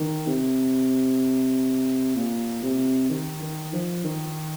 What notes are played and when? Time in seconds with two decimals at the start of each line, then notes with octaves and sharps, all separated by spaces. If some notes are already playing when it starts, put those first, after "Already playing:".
Already playing: D#3
0.27 C3
2.15 A#2
2.62 C3
3.10 D#3
3.41 D#3
3.73 F3
4.04 D#3